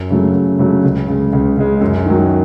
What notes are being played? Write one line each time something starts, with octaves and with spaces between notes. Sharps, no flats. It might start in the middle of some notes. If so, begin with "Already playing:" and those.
Already playing: F#2
C#3 F#3 A3
F#2
C#3 F#3 A3
C#2
C#3 G#3
C#2
C#3 G#3
F#2
D#3 F#3